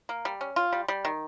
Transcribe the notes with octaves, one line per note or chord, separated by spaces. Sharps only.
A#3
G3
C#4
F4
G3
G3
D#3